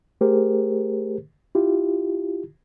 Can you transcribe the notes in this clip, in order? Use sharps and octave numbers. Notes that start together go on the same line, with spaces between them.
A3 G4 G#4 A#4 C5
E4 F4 G4